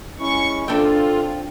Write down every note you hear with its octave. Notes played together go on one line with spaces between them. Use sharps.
G#3 C#4 E4 C#6
C4 D4 F4 A4 E5 G5